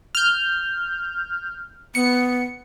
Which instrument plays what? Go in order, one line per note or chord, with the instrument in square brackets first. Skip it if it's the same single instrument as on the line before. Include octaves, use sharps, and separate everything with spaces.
[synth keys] F6 G6
[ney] B3 [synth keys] C#7